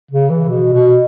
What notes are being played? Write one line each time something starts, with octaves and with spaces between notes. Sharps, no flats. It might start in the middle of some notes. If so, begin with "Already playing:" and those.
C#3
E3
B2
B2